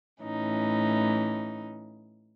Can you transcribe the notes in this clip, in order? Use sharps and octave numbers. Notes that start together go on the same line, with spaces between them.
A2 E3 C#4 D#4